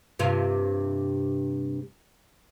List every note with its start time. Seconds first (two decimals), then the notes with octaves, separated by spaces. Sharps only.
0.19 G2 C3 F4